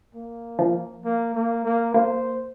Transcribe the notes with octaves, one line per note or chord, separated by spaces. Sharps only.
A#3
F3
A#3
A#3
A#3
A#3 C5